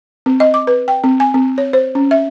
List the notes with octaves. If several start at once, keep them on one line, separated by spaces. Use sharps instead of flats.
C4
D#5
D6
B4
G5
C4
G#5
C4
C#5
C5
C#4
E5